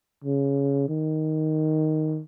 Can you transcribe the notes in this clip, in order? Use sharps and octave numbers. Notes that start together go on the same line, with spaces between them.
C#3
D#3